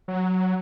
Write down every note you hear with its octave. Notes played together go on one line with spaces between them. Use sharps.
F#3